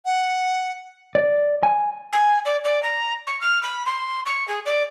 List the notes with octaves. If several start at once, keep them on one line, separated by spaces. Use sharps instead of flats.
F#5
D5
G#5
G#5
D5
D5
A#5
C#6
F6
B5
C6
C#6
G#4
D5